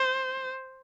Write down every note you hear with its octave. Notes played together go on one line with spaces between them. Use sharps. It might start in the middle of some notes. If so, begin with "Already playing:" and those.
Already playing: C5